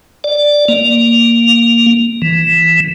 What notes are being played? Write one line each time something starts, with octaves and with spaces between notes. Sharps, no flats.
D5
A#3
E3